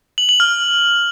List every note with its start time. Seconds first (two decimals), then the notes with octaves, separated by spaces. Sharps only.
0.18 F#7
0.29 F#7
0.40 F6